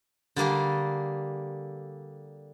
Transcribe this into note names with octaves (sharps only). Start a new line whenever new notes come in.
D3 G3 A#3 G#4